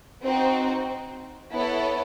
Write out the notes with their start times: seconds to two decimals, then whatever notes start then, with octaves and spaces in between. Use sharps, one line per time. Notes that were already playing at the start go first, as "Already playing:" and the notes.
0.24 C4 D#4 F#4
1.53 B3 E4 A4 C#5